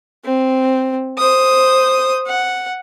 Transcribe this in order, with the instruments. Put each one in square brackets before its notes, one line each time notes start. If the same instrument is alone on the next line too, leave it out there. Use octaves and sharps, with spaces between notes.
[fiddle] C4
C5 D#6
F#5